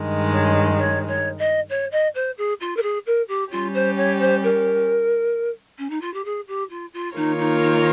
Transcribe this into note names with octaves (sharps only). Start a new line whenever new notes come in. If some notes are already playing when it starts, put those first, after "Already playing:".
Already playing: G2 D#3 G#3
C#5
C#5
C#5
D#5
C#5
D#5
C5
G#4
F4
A#4
G#4
A#4
G4
G3 C#4 F4 G4
C5
C#5
C5
A#4
C#4
D#4
F4
G4
G#4
G4
F4
F4
D#3 A#3 D#4 F4 A#4 C#5
D#4
D#4